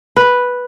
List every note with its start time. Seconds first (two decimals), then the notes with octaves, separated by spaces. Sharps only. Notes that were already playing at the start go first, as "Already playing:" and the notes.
0.16 B4